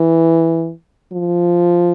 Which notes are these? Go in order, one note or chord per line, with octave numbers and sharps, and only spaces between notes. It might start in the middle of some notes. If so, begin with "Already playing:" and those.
Already playing: E3
F3